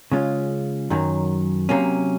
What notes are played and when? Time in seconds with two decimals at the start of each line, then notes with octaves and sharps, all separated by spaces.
0.11 C#3 G#3 C#4 F4
0.90 F#2 D#3 F#3
1.69 C3 F#3 A#3 C#4